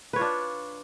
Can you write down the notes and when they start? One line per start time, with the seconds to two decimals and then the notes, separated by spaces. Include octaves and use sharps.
0.13 B4
0.16 C#5
0.19 F4
0.21 D4